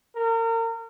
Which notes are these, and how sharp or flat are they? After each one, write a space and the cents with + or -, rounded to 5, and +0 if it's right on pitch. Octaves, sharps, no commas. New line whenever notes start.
A#4 -35